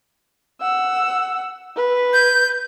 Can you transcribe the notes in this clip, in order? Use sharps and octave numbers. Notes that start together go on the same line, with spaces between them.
F#5 E6
B4
G6